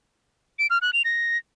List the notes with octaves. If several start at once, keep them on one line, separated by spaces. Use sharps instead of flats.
D7
F6
F#6
F7
A#6